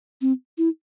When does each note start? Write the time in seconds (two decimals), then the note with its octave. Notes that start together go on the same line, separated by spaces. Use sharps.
0.21 C4
0.58 E4